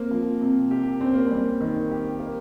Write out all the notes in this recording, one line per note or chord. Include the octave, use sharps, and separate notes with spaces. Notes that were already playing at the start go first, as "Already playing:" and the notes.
Already playing: A#3 C4
F3
C3
G4
C4 C#4
A#3
G3 C4
D#3
G4
A#3